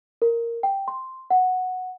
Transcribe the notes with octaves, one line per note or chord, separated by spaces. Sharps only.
A#4
G5
C6
F#5